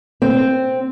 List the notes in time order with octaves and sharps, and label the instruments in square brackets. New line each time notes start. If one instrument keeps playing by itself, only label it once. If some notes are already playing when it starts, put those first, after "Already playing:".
[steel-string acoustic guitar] C4